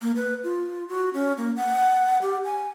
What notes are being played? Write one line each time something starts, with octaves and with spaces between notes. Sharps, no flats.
A#3
B4
F4
F#4
C#4
A#3
F#5
G4
G#5